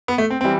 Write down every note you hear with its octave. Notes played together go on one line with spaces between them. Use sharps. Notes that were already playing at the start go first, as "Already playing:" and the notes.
B3
A3
C4
E3 G3 C4